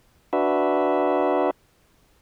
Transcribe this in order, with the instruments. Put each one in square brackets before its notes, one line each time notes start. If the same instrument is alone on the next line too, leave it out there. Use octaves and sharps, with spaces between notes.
[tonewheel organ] D4 F#4 B4 E5